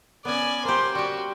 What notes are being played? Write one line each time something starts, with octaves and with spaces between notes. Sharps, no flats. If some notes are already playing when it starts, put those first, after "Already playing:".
B3 C#4 D5 G#5
A#3 G4 C5
G3 F#4 G4